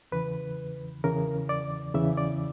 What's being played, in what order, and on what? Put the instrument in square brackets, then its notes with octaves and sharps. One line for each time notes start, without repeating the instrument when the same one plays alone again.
[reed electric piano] E2 C#3 E3 B4
E2 C#3 E3 A#4
D5
E2 C#3 E3 E5
D5